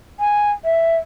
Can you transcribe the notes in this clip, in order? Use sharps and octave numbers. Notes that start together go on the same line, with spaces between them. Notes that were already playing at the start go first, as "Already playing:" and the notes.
G#5
E5